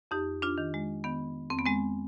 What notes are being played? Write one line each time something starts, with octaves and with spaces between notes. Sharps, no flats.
F2 D#4 G4
D4 F4
D#3
G#3
D#3 B3
F2 C4
B3
G#3 C4